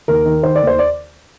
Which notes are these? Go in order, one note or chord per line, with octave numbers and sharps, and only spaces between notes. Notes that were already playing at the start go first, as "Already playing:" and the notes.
D#2 A#4
D#3
D#3 C5
D5
D#2
C5
D5